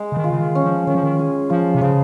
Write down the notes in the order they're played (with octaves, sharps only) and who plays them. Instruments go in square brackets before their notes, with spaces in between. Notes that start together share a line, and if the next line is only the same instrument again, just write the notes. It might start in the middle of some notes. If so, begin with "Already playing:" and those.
Already playing: [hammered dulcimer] G#3
[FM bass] C#3
D#3
[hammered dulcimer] F4
[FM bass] C#3
D#3
[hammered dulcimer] C#4
[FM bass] F3
[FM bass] D#3 [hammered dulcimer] C#4
[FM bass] F3
D#3
[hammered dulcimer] G#4
[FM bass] F3 [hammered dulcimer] F4
[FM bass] C3
[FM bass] C#3 [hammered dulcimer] F3